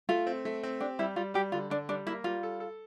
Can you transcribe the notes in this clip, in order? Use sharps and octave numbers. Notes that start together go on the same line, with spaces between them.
A3 F4
C4
A3
C4
D4 G4
G3 E4
G3 F4
G3 G4
D3 F4
D3 D4
G3 D4
A#3 E4
G3 F4
A4
A4